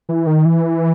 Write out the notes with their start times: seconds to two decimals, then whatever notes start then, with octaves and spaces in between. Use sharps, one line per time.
0.09 E3
0.27 D#3
0.45 E3